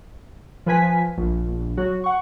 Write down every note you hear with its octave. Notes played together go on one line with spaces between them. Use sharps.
F3 B4 G#5 B6
A#1
F#3 F#4
F#5 C#6